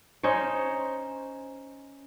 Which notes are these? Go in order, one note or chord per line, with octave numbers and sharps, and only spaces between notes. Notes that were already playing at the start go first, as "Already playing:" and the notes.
C#4 D#4 C5 C#5